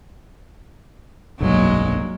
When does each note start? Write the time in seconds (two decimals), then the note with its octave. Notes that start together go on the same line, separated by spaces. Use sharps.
1.40 F1 B1 G2 F#3 G#3 A#3